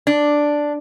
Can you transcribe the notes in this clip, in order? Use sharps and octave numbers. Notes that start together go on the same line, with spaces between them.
D4